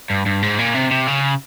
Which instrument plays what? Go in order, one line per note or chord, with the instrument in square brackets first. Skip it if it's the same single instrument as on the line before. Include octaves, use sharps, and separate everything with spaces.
[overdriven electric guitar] G2
G2
G#2
A#2
C3
C3
C#3